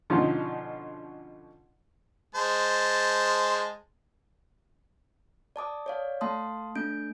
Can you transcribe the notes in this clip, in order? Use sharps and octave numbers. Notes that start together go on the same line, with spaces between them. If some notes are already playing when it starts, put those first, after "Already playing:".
B2 D3 F3 C#4 D#4 F4
G#3 C5 A5
D5 A5 D6 D#6
C#5 D5 F5
A3 F5 A5 C6 D#6
A3 D4 G6 D7